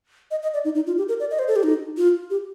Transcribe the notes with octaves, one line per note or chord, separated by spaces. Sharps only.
D#5
D#5
D5
D#4
D#4
F4
G4
A#4
D5
D#5
C5
A4
G4
D#4
F4
G4